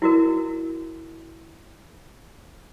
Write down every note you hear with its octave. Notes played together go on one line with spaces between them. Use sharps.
E4 F#4 A#4